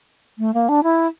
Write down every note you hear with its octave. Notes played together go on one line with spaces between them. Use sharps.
A3
A#3
D4
E4